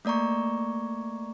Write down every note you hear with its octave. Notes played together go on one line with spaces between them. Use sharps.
A3 A#3 D5 A#5 C#6